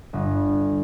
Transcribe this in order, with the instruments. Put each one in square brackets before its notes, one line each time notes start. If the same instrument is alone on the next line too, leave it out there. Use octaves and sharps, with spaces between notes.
[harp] G1